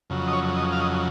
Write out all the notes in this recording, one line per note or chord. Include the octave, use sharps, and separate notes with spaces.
F2 C#3 F#3
D#5
C#5
D#5
F5
D#5